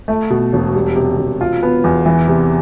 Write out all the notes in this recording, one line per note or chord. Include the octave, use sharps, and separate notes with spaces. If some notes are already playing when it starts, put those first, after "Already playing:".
A3
B2
E1
G3
C3
E1
F4
B3
E2
E3
C3